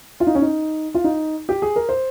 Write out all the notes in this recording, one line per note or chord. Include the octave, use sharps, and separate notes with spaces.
F4
D#4
C#4
D#4
F4
D#4
G4
G#4
A#4
C5